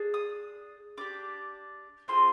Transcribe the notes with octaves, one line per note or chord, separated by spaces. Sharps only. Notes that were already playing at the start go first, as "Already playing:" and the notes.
Already playing: D4 G#4
D#6
D4 G4 D6
C4 F4 G#4 C6